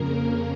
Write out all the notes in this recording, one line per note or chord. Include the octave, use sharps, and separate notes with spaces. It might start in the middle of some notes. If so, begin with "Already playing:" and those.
Already playing: F2 C#3 A#3 A#4